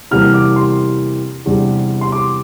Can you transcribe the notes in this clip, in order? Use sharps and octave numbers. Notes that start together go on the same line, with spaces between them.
E2 C3 E3 G3 A#3 F6
D6
C6
E2 C3 G3 D4
C6
D6